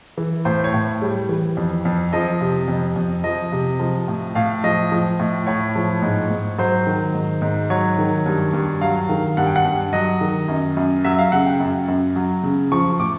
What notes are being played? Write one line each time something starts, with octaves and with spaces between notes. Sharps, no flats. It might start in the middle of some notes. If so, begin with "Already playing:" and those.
E3
A2 C5
C#5
A2
G3
E3
F2
F2
F3 D#5
C3
F2
F2
F3 D#5
C3
F3
A2
A2 F5
F3 D#5
F3
A2
A2 C#5
F3
G#2
G#2
F#3 C5
D#3
G#2
G#2
F#3 C#5
D#3
G2
G2
F#3 F5
D#3
G2 F#5
G5
F#5
G2
F#3 D#5
D#3
F#2
F#2
F#3 E5
F5
C#3 F#5
G5
F#2
F#2
F#3
C#3
F3 C#6
A2 D6